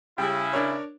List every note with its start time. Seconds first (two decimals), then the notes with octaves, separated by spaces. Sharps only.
0.18 C#3 G3 E4 G5
0.53 D4 A#4 C#5